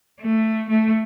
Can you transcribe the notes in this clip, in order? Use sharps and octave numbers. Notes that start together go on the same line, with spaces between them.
A3
A3